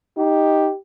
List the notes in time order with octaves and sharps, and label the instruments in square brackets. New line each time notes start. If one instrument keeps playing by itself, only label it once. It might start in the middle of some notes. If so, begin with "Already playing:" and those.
[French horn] D#4 [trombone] G4